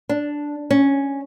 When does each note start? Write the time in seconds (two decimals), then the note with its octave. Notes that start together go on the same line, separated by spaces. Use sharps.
0.09 D4
0.71 C#4